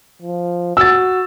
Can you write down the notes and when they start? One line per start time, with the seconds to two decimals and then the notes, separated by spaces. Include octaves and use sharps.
0.22 F3
0.77 F#4 E6 A6